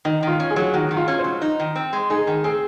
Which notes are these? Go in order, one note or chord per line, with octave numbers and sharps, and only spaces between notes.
D#3 D#4
D#3 F4
C#4
G#4
F#3
D#3 F#4
D#3
F4
C#4
C5
F#3
D#4
D#3
C4
G#3
D#4 G#4
D#3
C4 G#4